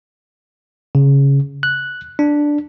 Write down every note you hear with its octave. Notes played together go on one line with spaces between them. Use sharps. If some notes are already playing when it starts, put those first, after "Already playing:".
C#3
F#6
D4